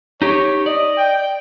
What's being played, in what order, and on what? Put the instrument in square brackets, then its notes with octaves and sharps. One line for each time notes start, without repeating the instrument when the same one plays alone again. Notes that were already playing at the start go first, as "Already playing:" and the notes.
[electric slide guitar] D#4 G4 [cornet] C#5
[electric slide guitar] D5 [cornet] D#5
[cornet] G5